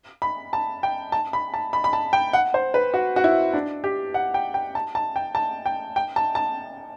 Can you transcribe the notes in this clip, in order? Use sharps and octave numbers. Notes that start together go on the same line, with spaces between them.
B5
A5
G5
A5
B5
A5
B5
B5
A5
G5
F#5
C5
B4
F#4
F#4
E4
D4
G4
F#5
G5
G5
A5
A5
G5
A5
G5
G5
A5
A5